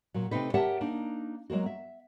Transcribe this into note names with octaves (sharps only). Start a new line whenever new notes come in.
A#2 F#3
C3 A3 C4 D#4 B4
G4 A#4 C#5 E5 F#5 A5
A#3 D4 D#4
F#3 G#3 A#3 F#4
E5